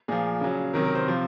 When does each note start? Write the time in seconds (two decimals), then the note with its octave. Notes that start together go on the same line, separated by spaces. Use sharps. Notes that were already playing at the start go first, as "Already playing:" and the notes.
0.08 A#2 F3 G#4
0.41 C#3 F#3
0.73 C3 D#3 F#3 A#4
0.85 A#4
0.95 C5
1.06 C3 F3